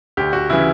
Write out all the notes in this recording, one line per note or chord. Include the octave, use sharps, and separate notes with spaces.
D2 G4
F#4
C#3 E3 E4